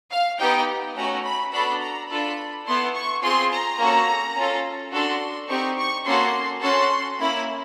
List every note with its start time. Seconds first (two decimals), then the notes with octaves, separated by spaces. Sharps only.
0.11 F5
0.39 B3 D#4 G4 G5
0.96 A3 C#4 F#4 A#5
1.24 B5
1.52 B3 D4 F#4 A4 B5
1.81 A#5
2.09 D4 F4 A4 B5
2.66 B3 E4 A4 C6
2.94 C#6
3.23 C4 F4 G#4 C6
3.51 A#5
3.79 A#3 C#4 F#4 A4
4.36 C#4 F4 A4
4.92 D4 F#4 A4 C6
5.49 C4 D#4 G4 C#6
5.78 C#6
6.06 A#3 C#4 F#4 A4 C6
6.62 C#4 F#4 A4 C6
7.19 A#3 C#4 E4 B5